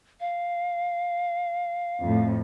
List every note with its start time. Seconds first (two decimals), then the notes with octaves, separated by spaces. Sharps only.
0.20 F5
2.00 F2 A2